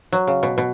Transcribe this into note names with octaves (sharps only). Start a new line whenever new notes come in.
F#3
C#3
B2
B2